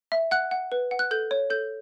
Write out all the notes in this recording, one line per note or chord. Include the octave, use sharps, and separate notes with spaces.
E5
F#5 F#6
F#5
B4
F#5
F#6
A4 G6
C#5
A4 G6